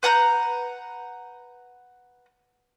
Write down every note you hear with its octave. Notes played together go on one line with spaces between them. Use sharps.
B4 F#5 A#5 G6